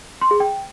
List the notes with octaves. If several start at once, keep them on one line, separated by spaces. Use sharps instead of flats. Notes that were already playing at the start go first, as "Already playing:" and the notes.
C6
G#4
G5